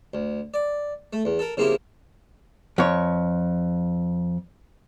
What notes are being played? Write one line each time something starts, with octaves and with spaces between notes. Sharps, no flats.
D2
D5
A3
E2
A4 A#4
C#3 F3 A#3 C4 E4 G4
F2 C#5